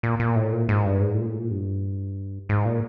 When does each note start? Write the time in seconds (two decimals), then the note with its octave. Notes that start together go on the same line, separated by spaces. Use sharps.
0.03 A#2
0.20 A#2
0.36 A2
0.53 A#2
0.69 G#2
0.85 G2
1.01 G#2
1.14 A2
1.21 A#2
1.26 A2
1.38 A#2
1.51 G2
2.49 G#2
2.65 A#2